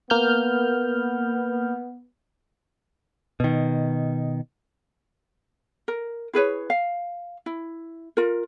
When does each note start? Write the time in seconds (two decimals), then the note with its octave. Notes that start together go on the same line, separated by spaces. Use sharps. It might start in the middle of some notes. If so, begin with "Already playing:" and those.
0.10 A#3 B3 F6 G6
3.40 B2 D#3
5.88 A#4
6.33 E4 G#4 B4 C#5
6.70 F5
7.46 E4
8.17 F4 A#4